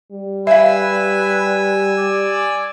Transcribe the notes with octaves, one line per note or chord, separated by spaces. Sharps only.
G3
B4 E5 F5 G#5 E6
D5